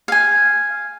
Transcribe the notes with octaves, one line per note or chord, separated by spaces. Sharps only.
F5 G#5